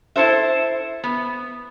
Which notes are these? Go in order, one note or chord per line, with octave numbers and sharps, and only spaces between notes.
E4 A4 C5 E5
B3